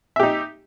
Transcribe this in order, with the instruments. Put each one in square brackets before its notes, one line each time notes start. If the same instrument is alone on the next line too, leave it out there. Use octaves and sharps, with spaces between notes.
[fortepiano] E5
G4
D#4